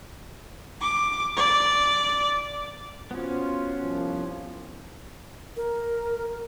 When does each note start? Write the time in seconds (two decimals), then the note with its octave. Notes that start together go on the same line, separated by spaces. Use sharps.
0.81 D6
1.37 D5
3.11 B3 C#4 F4 F#4 C5
3.82 C2 F3
5.57 A#4